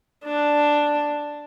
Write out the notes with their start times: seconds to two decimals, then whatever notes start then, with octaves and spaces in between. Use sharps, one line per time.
0.25 D4